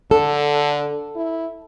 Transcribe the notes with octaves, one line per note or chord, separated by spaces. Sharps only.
D3 A4
E4